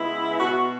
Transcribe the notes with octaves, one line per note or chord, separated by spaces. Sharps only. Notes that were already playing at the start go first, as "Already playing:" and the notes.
Already playing: C#3 G#3 B3 E4
B2 B3 F#4
F#4